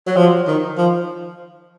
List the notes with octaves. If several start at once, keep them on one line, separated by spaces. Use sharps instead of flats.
F#3
F3
D#3
F3